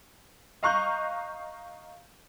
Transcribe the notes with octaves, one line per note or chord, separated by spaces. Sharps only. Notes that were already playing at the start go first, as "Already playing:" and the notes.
D#5 F5 A#5 C#6 F#6 G6